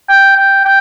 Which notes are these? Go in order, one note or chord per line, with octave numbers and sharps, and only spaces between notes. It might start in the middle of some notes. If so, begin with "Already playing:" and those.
G5
G5
G5